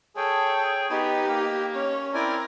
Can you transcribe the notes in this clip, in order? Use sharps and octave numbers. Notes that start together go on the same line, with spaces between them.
G#4 A4 C#5 G5
B3 D#4 G4
A#3
C#4 C#5
C4 E4 A#4 D5 G#5